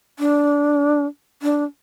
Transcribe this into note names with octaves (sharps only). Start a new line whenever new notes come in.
D4
D4